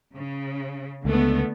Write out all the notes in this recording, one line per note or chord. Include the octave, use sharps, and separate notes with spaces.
C#3
C#2 D3 A3 B3